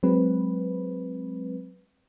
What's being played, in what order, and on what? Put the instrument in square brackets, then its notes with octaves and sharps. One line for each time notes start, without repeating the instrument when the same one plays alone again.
[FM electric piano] F#3 G#3 C4 B4